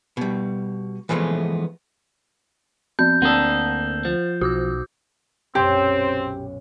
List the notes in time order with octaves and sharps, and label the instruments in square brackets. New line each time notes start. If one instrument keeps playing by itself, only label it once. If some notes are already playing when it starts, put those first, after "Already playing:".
[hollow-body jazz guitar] B2 G3
E3 F3 G#3 A3 B3
[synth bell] F3 C4 [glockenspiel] G6
[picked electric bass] D2 C4 [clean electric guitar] A#3 D4 A4 [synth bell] F#5 D#6
[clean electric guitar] F3 [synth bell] C5
[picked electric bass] B1 [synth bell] F#4 D6 E6
[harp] B1 F#2 A#2 [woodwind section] C4 [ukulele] G4